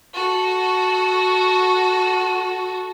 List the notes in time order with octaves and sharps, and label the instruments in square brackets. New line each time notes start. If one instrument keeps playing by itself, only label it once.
[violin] F#4 A4